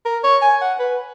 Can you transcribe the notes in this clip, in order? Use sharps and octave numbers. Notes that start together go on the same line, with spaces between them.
A#4
C#5
G#5
F#5
B4